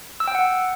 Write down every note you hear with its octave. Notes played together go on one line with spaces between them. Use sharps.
E6
G5
F#5